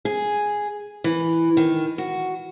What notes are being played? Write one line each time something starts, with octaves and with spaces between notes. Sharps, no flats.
G#4
E3
D#3
F#4